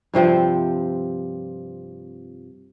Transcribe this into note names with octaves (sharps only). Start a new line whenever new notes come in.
G2 C3 F3 C4